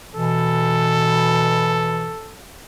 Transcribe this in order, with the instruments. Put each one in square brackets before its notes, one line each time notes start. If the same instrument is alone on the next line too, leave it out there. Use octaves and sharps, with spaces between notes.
[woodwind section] B2 E3 [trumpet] A4